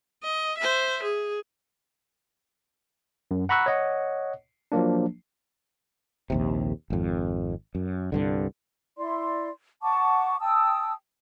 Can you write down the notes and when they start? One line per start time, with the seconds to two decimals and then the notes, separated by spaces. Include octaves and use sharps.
0.23 D#5
0.58 C5 E5
1.03 G#4
3.31 F#2
3.49 F#5 A#5 B5 C#6 E6 F#6
3.66 C#5 D#5 F#5
4.72 F3 F#3 A#3 D4
6.30 A#1 D#2 C3
6.90 G#1 F2
7.75 F#2
8.12 C2 G2 D3
8.98 E4 D5 C6
9.82 F#5 A5 C#6 D6
10.40 G5 A5 D#6 E6